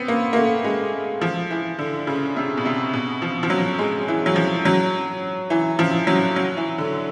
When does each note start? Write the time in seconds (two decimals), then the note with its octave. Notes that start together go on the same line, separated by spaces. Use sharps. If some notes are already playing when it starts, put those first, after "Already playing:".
Already playing: B3 C4
0.08 A#3
0.33 A#3
0.36 A3
0.64 G#3
1.21 F3
1.51 E3
1.79 D3
2.07 C#3
2.36 C3
2.57 B2
2.65 C3
2.93 B2
3.22 F3
3.43 F3
3.50 F#3
3.78 G#3
4.08 E3
4.26 F#3
4.36 F3
4.65 F#3
5.50 E3
5.79 F3
6.07 F#3
6.36 F#3
6.57 E3
6.78 D3